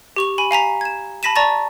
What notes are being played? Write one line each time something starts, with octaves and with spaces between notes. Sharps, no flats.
G4 C#6 F7
G#5 B5
F5 G#5 A#5 B6
G#6 E7
A5 B5 A#6 B6 D#7 E7
D5 A5 A#5 C#6 A6 A#6